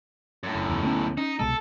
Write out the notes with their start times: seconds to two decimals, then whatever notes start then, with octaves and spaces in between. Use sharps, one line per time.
0.43 F#2 A2
0.55 F#1
0.70 F#1 E2
0.83 D2 B3 C#4
1.17 C#4 D#4
1.40 C2 B2 G#3 A4